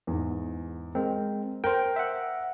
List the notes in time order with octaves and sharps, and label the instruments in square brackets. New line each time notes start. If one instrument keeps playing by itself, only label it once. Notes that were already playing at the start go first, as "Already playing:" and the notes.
[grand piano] E2 G#2
[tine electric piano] G#3 C4 [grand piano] A#4
[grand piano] A#4 [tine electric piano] C5 G5
[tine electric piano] E5 F#5